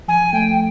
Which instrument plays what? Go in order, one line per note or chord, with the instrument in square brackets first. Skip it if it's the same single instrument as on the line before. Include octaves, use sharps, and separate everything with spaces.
[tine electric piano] F3 [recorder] G#5
[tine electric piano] A3 [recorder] G5